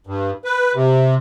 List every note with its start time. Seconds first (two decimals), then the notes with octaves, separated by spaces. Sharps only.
0.07 G2
0.44 B4
0.75 C3